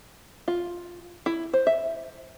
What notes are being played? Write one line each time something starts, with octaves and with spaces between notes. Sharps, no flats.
F4
E4
C5
E5